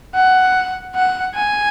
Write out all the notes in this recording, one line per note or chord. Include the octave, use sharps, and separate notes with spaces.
F#5
F#5
G#5